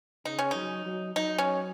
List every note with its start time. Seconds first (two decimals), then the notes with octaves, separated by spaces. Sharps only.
0.25 C#3 D#4
0.39 C#4
0.51 F#3 D#4
0.86 F#3
1.16 F#3 D#4
1.38 C#4